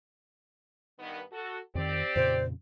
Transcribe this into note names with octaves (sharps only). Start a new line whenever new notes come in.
G2 D#3 B3
F#4 A4
F2 D#3 C4 G4 D5
F2 A#2 C#3 C5